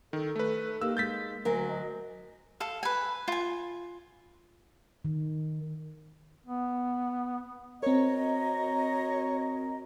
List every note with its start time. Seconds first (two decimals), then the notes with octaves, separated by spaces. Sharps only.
0.13 D#3 A4
0.36 A3 B4
0.81 A#3 D#4 G4 E6
0.97 G#3 G6 A6 B6
1.45 D2 F#3 A#4 G#5
1.69 D#5
2.60 A4 F5
2.83 B4 G#5
3.28 F4 G#5
5.05 D#3
6.47 B3
7.83 C4 F#4 A#4 C#5 D#5 A#5